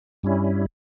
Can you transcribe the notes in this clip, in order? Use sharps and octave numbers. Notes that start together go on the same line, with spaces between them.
G2 G3 C#4 E4